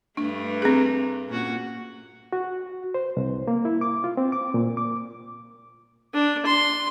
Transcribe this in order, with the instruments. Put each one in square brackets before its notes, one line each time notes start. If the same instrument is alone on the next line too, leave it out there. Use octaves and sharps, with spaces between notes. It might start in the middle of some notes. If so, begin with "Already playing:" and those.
[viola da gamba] G2 A3 [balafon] D4
[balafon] C4 G#4
[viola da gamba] A#2 C#4 F#4
[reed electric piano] F#4
C5
C2
A#3
E4
D6
F4
C4
D6
A#2
D6
[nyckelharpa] D4
C6